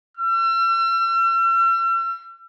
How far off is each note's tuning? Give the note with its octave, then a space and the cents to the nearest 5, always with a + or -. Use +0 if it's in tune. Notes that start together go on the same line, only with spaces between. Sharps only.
E6 +45